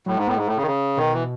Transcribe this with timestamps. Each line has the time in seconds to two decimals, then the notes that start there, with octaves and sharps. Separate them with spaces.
0.06 A2 F#3
0.17 G#2 G#3
0.27 A2 B3
0.37 G#2 G#3
0.47 A2 A3
0.56 C#3
0.62 D#3
0.67 C#3
0.97 B2 D#3
1.13 E3